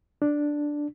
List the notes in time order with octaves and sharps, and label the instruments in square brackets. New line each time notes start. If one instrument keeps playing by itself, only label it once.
[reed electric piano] D4